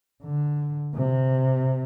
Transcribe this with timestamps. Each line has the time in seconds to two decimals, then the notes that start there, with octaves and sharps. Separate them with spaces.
0.24 D3
0.96 C3